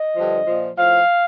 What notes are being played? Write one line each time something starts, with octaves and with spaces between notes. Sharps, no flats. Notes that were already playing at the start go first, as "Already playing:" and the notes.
Already playing: D#5
G2 D3 F3
A#2 F3
A2 F3 F5